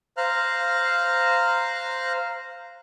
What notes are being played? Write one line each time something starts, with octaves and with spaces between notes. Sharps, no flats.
C5 F5 A#5 F6 F#6